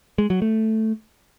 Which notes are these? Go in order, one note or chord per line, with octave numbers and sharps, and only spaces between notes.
G#3
F#3
A3